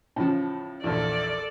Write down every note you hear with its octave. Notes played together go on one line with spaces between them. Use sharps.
A2 C#3 F3
A#1 E2 A4 D5